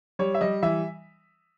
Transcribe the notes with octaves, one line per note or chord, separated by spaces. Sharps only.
G3 C#5
E5
G3 D#5
E3 E5